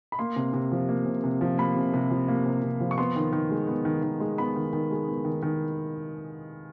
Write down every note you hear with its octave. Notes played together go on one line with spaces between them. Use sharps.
B5
A#3 C6
C3
C3
F3
A#3
C3
C3
F3
A#3 B5
C3
C3
F3
A#3
C3
C3
F3
C#6
B3 C6
D#3
D#3
G#3
B3
D#3
D#3
G#3
B3 B5
D#3
D#3
G#3
B3
D#3
D#3